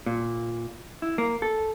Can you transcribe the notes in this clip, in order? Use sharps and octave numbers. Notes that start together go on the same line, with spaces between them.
A#2
E4
A#3
A4